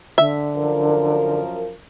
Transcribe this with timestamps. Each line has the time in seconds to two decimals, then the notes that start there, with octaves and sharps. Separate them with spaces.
0.18 D3 E5
0.56 F#2 F3 A#4